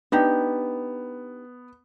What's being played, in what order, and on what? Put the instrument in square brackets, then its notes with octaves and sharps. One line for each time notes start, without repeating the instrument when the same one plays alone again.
[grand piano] B3 [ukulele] D4 D#4 G4